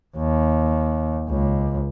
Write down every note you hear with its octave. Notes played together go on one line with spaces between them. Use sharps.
D#2
C#2